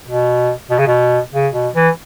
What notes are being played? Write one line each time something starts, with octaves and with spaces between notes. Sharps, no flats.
B2
B2
C#3
B2
C#3
B2
E3